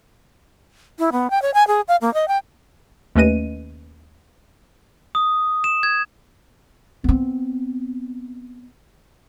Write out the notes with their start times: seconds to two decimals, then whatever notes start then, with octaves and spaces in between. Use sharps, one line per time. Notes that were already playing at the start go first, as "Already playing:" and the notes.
0.99 E4
1.12 B3
1.31 G5
1.42 C#5
1.54 G#5
1.67 G#4
1.88 F5
2.01 A#3
2.14 D#5
2.28 G5
3.15 D#2 A3 C#4 B4 D#5 D#7
5.15 D#6
5.64 E7
5.83 G#6
7.04 B3 C4